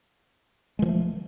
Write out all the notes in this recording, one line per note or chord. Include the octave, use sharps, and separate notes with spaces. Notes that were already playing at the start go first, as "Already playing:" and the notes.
E3 F3 G#3 A3